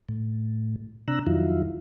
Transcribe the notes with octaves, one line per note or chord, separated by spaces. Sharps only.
A2
C3 D4 A#5 E6 F#6
F2 D#3 F#3 E4 F4